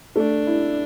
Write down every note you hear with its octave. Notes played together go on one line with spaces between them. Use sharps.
A3 D4
E4